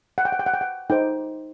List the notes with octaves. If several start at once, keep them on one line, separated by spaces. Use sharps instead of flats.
F#5
G5
F#5
G5
F#5
G5
F#5
D#4 A4 C5 G5